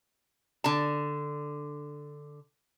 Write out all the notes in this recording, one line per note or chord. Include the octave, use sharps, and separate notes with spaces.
D3 A5